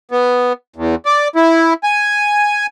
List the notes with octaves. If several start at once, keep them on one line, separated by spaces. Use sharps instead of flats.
B3
E2
D5
E4
G#5